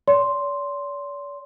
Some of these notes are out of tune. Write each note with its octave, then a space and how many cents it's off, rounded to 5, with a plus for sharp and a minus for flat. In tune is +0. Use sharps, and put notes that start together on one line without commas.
D5 -45 C6 +0